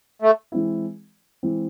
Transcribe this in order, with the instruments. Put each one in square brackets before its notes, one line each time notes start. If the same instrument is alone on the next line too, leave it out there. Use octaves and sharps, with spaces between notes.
[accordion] A3
[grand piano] E3 G#3 C4 E4
E3 G#3 C4 E4